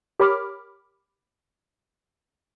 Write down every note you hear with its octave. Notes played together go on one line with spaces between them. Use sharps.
G4 A#4 C#5 B5 D6 F6